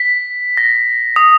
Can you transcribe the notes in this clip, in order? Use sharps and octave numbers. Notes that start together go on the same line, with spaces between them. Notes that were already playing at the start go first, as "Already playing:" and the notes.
Already playing: B6
A#6
D#6